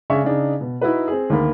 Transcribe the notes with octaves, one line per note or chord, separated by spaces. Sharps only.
C#3 D4 E5 G#5 C#6
C#3 D4 D#4
B2
D#4 E4 F#4 B4
C4 G#4
D2 D#3 A#3 B5